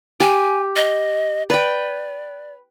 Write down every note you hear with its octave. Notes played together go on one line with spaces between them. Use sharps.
G4 G#5
D#5
B4 D5 G5